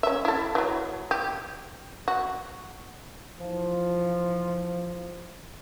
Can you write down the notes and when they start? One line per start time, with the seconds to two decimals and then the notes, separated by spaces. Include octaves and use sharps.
0.03 C#4 E5
0.25 E4 A4
0.55 E3 F#3
1.11 G4
2.08 F#4
3.40 E3 F3